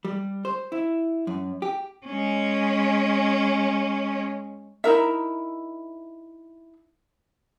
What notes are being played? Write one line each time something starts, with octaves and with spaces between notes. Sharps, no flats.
G3
C5
E4
F#2
G4
G#3 C#4
D#4 E4 A#4 E5